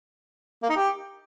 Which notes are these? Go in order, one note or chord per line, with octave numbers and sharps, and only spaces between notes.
A#3
D#4
G4